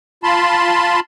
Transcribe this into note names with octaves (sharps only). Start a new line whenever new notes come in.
F4 A5 B5 C6